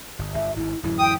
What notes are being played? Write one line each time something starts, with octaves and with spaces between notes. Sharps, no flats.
G1
G1 E5
G#1 G#2 E4
D1 F#2 E3 E4
G5 D#6